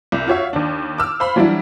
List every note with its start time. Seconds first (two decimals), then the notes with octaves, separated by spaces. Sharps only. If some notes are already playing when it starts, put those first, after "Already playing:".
0.12 C2
0.27 F4 F#4 C#5 E5 F5
0.53 D#2 D4
0.98 D6 E6 F6
1.20 C5 F5 B5
1.36 E3 F#3 G3 D4 E4